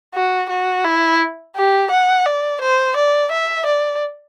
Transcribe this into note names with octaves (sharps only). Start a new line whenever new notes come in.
F#4
F#4
E4
G4
F#5
D5
C5
D5
E5
D5